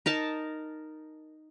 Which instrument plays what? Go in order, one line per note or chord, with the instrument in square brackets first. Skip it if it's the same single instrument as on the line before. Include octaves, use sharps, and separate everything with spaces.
[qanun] D#4 A#4 A5